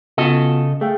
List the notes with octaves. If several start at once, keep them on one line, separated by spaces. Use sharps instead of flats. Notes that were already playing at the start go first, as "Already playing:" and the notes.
C#3 B3 F4 F#4 A4 D#5
A3 G#4 F5 G5